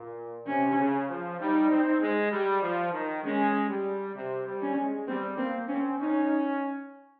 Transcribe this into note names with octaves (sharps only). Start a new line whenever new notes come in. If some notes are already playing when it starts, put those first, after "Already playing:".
Already playing: A#2
C3 C#4
C#3
F3
G3 D#4
C4
G#3
G3
F3
D#3
G#3 C#4
G3
C3
G3
C#4
G#3
G3 C4
A#3 C4
C4 C#4
C#4 D#4